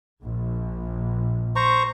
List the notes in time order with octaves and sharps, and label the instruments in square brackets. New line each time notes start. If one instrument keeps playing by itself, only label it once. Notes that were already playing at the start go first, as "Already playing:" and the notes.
[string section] A#1
[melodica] C5 A#5 C#6